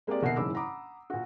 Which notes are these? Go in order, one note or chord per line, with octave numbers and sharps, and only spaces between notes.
G#3 A#3 C4 G4 D5
D#1 B2 F#4 A#4 E5 C7
F#1 G#2 E3 B5 D6 E6
F#5 A#5 B5 D6 D#6
A#2 F#4